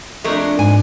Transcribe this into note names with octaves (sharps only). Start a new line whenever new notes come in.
F2 G#3 A3 D4 A#4
G#2 G#5